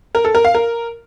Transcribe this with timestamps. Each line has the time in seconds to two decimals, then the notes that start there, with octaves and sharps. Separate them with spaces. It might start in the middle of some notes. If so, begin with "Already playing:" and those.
0.15 A#4
0.25 A4
0.35 A#4
0.45 F5
0.55 A#4